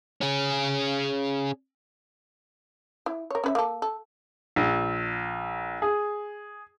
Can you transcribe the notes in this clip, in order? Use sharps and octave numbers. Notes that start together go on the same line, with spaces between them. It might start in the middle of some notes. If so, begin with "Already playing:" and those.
C#4 G#4
E4
A#4 C#5
C#4 B4 E5
A#3 A4
A4
A#1
G#4